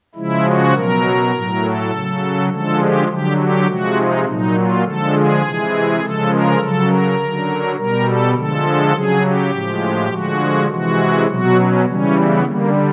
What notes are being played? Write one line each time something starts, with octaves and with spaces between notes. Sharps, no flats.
C#3 F3 G#3 E4
F#4
B2 F#3 A#4
A2 F#3
A4
C#3 F#3
D3 F3 G#3 A4
G4
D3 F#3 G4
G4
C3 F3 G#3 F#4
D#4
A#2 F#3 D#4
F4
D3 F3 G#3 A4
G#4
C3 E3 G#3
C#3 F3 G#3 A4
A#4
C#3 F#3 A4
A#4
D3 F#3
B2 G3 A#4
A4
D3 F3 G#3 A4
C#3 F#3 G#4
G4
A2 F3 G#3
D3 F3 G#3 F#4
C3 E3 G#3 F#4
B2 F#3 F#4
C#4
C#3 E3 G3 C#4
B3
D3 G3 A#3